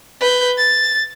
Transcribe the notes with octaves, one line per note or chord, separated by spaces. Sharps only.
B4 G6
A6